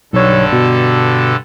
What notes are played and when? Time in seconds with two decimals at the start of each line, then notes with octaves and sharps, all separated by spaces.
0.13 B1 G2 D3 A4 C#5
0.52 B2